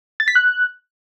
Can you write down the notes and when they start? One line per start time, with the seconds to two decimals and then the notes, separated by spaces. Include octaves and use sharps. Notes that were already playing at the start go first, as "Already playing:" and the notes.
0.20 A6
0.28 B6
0.35 F#6